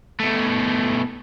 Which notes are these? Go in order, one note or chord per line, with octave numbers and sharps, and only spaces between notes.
B2 A3